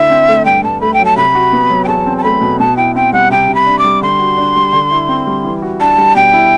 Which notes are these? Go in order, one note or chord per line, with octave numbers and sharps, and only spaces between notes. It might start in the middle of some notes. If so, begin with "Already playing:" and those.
Already playing: D3 A3 E4 E5
C4
A3
G2 G5
G2 A5
A3 B5
G5
F#3
A5
C3 B5
F#4
B3
F#3
G5
E2 A5
C4
A5
A3 B5
B2
B2 A5
E4 G5
C4 G5
G3 F#5
C3 G5
C3
B5
D4
D6
G3
D3 C6
F#4
D4
G3
D3
E4
C4
G3
E3
F#4
D4 A5
G3
B2 G5
E4